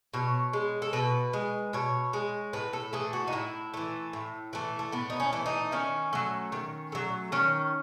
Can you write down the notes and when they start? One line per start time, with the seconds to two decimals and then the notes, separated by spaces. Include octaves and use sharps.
0.14 B2 C#5
0.53 G#3
0.82 A4
0.93 B2 B4
1.33 G#3
1.73 B2 C#5
2.13 G#3
2.53 A2 B4
2.73 A4
2.93 E3 A3 G#4
3.13 F#4
3.28 D#4
3.32 A2 E4
3.74 E3 A3
4.13 A2
4.53 E3 A3
4.79 A3
4.92 A2 B3
5.10 D#4
5.20 C#4
5.33 E3 A3
5.46 D#4
5.72 D#3 C#4
6.13 F#3 A3
6.52 D#3
6.92 F#3 A3
7.32 D#3 C#4